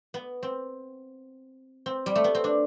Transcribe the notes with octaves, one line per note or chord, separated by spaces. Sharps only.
B3
C4
C4
G3
A3
B3
C4
D4